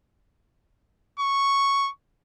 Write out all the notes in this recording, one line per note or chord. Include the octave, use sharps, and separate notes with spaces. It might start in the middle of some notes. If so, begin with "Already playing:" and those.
C#6